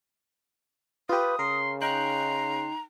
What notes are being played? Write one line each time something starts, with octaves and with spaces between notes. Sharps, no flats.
F4 G4 B4 D#6
C#3 A#4 C6
D#4 G5 A#5 C6 F#6